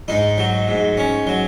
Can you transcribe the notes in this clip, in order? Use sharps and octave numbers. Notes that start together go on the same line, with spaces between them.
G#2 D#4
F#3
G#2
C#4
F#3